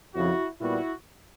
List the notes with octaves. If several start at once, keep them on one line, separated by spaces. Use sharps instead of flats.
F2 C#3 F3 E4 F#4
A#2 G3 B3 E4 F#4